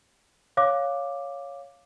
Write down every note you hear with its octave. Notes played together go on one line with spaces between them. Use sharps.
C#5 F5 D6